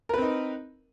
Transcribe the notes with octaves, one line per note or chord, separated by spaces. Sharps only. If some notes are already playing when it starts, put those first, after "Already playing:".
C4 D#4 A#4 B4